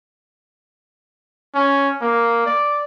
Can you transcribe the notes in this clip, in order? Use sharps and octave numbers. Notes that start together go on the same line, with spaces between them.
C#4
A#3
D5